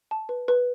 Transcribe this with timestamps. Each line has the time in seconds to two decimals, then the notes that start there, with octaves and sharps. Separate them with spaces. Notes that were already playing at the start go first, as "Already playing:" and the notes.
0.11 A5
0.29 B4
0.48 B4